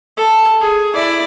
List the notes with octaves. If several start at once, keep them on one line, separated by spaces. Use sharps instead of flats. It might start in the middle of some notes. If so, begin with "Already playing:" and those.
A4
G#4
E4 D5